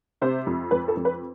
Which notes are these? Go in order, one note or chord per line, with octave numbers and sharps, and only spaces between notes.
C3 C5
F2
F2 B4
A4
F2
B4